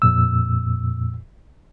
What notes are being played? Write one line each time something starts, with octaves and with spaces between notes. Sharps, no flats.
F2 A#2 E6